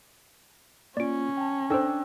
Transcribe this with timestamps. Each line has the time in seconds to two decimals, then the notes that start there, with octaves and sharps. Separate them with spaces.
0.97 A#3 C#4 F4 D5 D7
1.37 G5 A5
1.70 D4 A4 C5 G5 E6